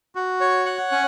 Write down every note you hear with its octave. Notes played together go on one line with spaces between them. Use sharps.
F#4
C#5
F#5
C#4